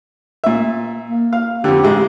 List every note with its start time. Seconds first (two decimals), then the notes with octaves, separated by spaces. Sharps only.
0.44 A#2 E5
1.10 A#3
1.33 F5
1.64 F2 D3 G4
1.83 A1 G#3